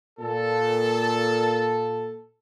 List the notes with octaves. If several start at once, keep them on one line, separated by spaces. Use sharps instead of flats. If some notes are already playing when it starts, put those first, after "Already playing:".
A#2 A4